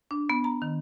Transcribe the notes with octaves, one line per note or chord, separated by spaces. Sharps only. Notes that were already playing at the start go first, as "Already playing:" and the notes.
D4
B3
A#5
D#3